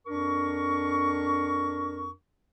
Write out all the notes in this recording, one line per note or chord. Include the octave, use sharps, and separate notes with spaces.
F2 D4 A#4 C#6